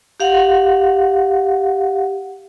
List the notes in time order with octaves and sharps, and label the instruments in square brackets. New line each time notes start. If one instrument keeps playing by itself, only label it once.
[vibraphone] G4 F5 F#5